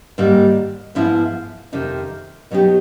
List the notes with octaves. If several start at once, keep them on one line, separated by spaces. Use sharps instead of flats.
G#2 D#3 G3 A#3
G#2 F3 G#3 B3 E4
F2 C3 D#3
B2 F#3 B3 D#4 G4